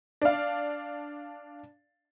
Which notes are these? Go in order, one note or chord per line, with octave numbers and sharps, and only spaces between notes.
D4 F5